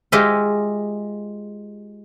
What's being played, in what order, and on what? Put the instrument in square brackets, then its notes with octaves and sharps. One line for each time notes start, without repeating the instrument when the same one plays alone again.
[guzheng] G#3 F4 G4 D#5 E5